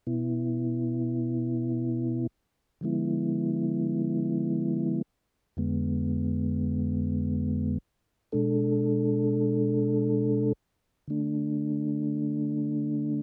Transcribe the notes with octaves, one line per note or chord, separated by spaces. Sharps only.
B2 B3 E4
D3 F3 G#3 B3 E4
F2 D3 G#3 B3
B2 G#3 D4 A4
D3 A3 D4